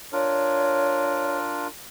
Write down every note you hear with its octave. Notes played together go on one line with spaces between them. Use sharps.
D4 F4 A#4 C#5